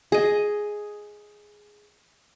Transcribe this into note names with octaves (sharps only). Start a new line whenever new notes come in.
G#4 D#5